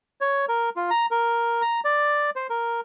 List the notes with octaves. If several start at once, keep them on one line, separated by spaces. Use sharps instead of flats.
C#5
A#4
F4
A#5
A#4
A#5
D5
C5
A#4